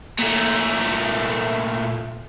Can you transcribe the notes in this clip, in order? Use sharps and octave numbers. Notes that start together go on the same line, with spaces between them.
A#2 A3